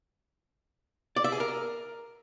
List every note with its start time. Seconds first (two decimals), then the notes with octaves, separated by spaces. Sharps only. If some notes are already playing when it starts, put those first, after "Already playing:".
1.16 D5
1.24 E5
1.32 G#4
1.40 A#4